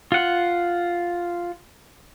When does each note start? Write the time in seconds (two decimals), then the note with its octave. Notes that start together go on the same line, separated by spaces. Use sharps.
0.12 F4 F#5